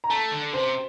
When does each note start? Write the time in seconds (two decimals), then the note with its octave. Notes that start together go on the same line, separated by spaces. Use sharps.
0.04 A#5
0.10 A3 A5
0.32 D3
0.53 C3 C5